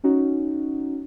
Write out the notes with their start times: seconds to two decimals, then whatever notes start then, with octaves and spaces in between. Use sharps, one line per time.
0.04 C#4 D#4 F#4